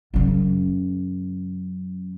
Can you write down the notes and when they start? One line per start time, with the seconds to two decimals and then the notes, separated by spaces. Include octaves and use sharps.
0.14 F#2 C#3